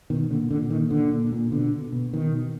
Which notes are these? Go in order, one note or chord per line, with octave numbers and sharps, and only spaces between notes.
B2 D#3
A#2 D3
A#2 D3
A#2 D#3
A#2 D3
A#2
A#2
B2 D3
B2
B2
B2 D#3
B2